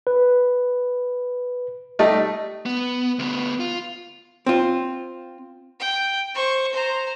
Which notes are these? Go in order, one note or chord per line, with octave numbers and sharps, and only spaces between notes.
B4
G3 A3 D#4
B3
D2 B3
F4
C4 F4
G5
C5 C#6
C5 A#5